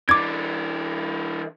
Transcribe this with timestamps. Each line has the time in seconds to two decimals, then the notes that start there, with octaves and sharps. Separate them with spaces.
0.09 E3 D4 D6 G#6